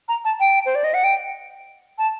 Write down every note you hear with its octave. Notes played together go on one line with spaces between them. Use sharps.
A#5
A5
G5
C5
D5
D#5
F#5
G5
A5